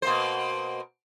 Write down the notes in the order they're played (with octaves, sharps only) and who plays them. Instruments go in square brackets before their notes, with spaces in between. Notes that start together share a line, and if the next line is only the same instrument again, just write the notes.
[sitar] B2 A#3 C5